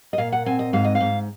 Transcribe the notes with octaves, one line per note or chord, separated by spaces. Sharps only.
D#5
A#2 F5
F#5
C4 G#5
D#5
G#2 F5
D#5
F5
G#2